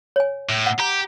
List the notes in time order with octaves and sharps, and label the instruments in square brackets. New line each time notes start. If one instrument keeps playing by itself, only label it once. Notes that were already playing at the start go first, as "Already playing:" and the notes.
[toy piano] C#5 G#5
[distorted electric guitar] A2
[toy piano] F#5
[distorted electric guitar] G4 [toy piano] A#5